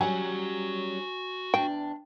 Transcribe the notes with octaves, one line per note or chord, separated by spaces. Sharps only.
F#3 G3 C#4 F#4 G#5 A#5
E2 D4 G5